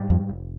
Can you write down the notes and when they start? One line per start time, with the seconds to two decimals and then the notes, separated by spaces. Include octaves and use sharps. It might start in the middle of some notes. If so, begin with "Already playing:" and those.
Already playing: G#2 G3
0.10 F2
0.29 F1